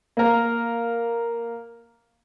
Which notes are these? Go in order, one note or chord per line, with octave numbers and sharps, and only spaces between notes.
A#3 A#4